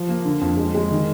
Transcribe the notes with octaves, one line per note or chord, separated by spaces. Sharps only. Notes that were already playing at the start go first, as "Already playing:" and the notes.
Already playing: F3
A#3
D3
F2
G#3
G#3
D#3